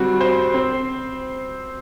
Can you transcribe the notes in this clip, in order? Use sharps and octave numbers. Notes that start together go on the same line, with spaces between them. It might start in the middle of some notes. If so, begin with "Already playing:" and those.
Already playing: G3 C4 F#4
C5
C4